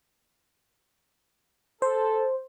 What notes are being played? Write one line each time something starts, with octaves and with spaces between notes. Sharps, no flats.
A4 C5